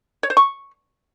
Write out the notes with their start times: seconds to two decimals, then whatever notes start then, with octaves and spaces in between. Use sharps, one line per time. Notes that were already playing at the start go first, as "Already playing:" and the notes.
0.23 C#5
0.30 C5
0.37 C#6